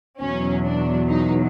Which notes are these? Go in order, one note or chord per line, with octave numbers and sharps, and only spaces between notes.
E2 B2 F#3 C#4
D4
D#4